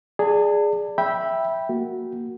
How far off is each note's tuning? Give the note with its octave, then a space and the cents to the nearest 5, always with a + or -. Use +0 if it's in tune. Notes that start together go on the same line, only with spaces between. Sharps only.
G#4 +0 D5 +0 A5 +40
E5 +0 G5 +0 B5 -15
A#3 +0 F#4 +0